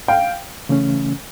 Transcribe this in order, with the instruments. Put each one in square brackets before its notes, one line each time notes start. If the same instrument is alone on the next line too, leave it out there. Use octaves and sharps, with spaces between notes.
[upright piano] F5 G5
[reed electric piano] C#3 E3 A3 C#4